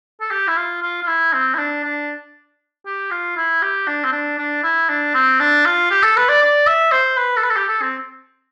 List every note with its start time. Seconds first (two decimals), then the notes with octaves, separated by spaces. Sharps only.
0.21 A4
0.31 G4
0.48 E4
0.57 F4
0.82 F4
1.03 F4
1.08 E4
1.33 C4
1.54 E4
1.58 D4
1.84 D4
2.86 G4
3.11 F4
3.37 E4
3.62 G4
3.87 D4
4.04 C4
4.12 D4
4.38 D4
4.63 E4
4.89 D4
5.14 C4
5.40 D4
5.65 F4
5.91 G4
6.03 A4
6.17 B4
6.29 D5
6.42 D5
6.67 E5
6.92 C5
7.17 B4
7.37 A4
7.43 B4
7.50 A4
7.56 G4
7.68 A4
7.82 C4